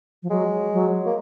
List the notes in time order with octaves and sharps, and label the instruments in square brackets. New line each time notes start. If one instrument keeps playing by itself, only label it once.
[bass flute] F3
[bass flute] F#3 [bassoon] G#3
[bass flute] F#3
[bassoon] A#3